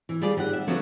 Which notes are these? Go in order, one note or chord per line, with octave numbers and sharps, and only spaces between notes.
E3
G3 F4 G#4 D5
D#3 G4 D#5 F#5
E5
D3 F3 F#3 B3 F#4